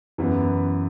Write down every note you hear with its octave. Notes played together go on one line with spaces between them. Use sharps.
F#2 E3 B3 E4